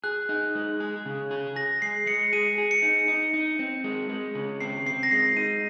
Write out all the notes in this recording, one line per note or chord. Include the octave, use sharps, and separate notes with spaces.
G#4 F#6
D#4
G#3
G#4
C#3
G#4
G#4 A#6
G#3 C7
G#3 C#7
G#4 D#7
G#4
C#7
D#4
D#4
D#4
C4
G#3
G#3
C#3
C4 C7
C4 C7
A#6
G#3 C7
D#4 D#7